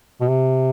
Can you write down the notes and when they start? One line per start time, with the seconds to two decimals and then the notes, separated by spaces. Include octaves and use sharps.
0.21 B2
0.28 C3